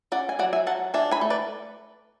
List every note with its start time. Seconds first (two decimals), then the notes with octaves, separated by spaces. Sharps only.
0.12 C#4 D5 F#5
0.29 G#5
0.39 F#3 D5 F#5
0.53 E5 G#5
0.67 F#3 F#5 A5
0.94 D4 E5 G#5
1.11 G#5 B5
1.21 A3
1.30 B4 D5